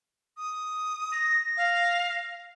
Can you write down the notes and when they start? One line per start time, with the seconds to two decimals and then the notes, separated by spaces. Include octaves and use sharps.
0.37 D#6
1.12 A#6
1.57 F5